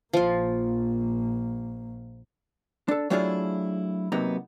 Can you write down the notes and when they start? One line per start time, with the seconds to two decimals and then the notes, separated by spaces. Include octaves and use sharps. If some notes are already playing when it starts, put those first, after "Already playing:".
0.13 A#1 F3 A#3 F4
2.88 D4 A4
3.10 F#3 A3 D4 E4 F4 G#4
4.12 C3 F#3 A#3 B3 D#4